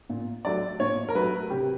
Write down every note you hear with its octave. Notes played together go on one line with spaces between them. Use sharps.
A#2
F#3 A3 D5
A#2 C#5
A#4
F#3 A3 B4
C3 G4